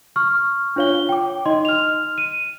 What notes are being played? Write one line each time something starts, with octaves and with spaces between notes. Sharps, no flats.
C#6 F6
D4 F4 C#5 F5 G7
G5 D6
D#4 D#5 C6
F6 F7
D#7